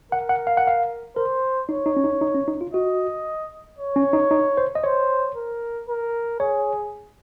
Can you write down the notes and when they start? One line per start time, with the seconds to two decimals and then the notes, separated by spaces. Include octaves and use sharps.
0.12 A#4 F#5
0.29 F#5
0.47 F5
0.57 F#5
0.67 F5
1.16 A#4 C5
1.69 D#4 C#5
1.86 D#4
1.97 C#4
2.04 D#4
2.21 D#4
2.34 C#4
2.48 D#4
2.61 F4
2.74 F#4 D#5
3.78 C#5
3.96 C#4
4.13 D#4
4.31 D#4
4.57 C5
4.75 D#5
4.83 C5 C#5
5.36 A#4
5.89 A#4
6.40 G#4 C#5